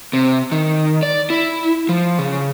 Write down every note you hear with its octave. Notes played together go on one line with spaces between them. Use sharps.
C3
D#3
D5
E4
F3
C#3